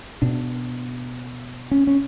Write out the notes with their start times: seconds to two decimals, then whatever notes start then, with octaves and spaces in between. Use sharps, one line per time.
0.22 B2 D4
1.71 C#4
1.87 C#4